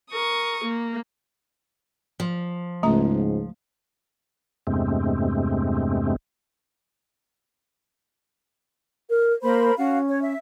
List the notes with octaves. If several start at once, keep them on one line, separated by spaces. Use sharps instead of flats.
A#4 C#6 D#6
A#3
F3
C#2 G#2 A3 A#5
E2 G2 C3 G#3 A3 C4
A#4
A#3 A#4 C5 B5
C#4 F#4 F5
C#5
E5